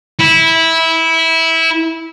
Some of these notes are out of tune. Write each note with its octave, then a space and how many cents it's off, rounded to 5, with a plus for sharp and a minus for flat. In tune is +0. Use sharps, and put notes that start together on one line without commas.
E4 -15